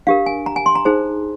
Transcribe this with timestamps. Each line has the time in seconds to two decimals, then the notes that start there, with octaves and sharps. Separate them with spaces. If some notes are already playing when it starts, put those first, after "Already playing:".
0.07 D4 G4 A#4 F5
0.26 G#5
0.46 A#5
0.56 G#5
0.66 C6
0.75 A#5
0.85 D#4 G#4 C5